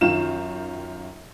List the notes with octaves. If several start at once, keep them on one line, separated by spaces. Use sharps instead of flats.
F#2 D#3 F4 E7